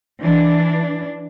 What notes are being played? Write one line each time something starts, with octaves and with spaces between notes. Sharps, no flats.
E3 D4